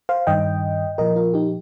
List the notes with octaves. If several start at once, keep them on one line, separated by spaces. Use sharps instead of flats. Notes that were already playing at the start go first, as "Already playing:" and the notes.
C5 F5
G2 D#3 D#5 G5
A#2 F3 A#4 D#5
F4 A#4
D#4 G4